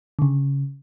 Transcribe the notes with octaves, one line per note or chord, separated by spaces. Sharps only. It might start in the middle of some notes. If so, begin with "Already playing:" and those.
D3
C#3